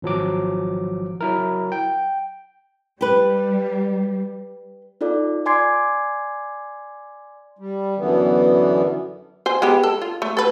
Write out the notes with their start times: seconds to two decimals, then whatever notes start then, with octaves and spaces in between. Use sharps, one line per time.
0.02 G#1 F3 F#3 D6
1.21 F#3 E4 A#4
1.72 G5
3.01 G3 G4 B4
5.01 D#4 F4 A4 D5
5.46 D5 G#5 C6 D6 G#6 C7
7.59 G3
7.97 F#2 D3 E3 B3
9.46 C5 G#5
9.62 G#3 B3 G4
9.83 A4
10.02 F4
10.22 A3
10.37 A4 B4